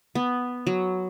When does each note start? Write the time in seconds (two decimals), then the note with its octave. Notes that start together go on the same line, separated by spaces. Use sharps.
0.15 B3
0.67 F#3